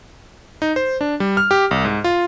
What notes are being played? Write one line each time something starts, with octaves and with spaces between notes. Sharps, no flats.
D#4
C5
D4
G3
F6
G4
C2
G#2
F4